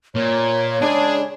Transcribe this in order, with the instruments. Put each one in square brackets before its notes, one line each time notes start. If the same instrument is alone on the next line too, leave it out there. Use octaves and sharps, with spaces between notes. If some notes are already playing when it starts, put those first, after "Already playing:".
[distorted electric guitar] A#2 [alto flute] C#5
[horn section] C#3 G#3 D4 [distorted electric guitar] G#4